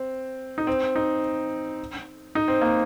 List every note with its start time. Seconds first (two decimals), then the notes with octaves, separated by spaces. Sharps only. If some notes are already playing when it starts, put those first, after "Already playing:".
Already playing: C4
0.58 D#4
0.67 C4
0.96 D#4
2.35 D#4
2.48 C4
2.62 A#3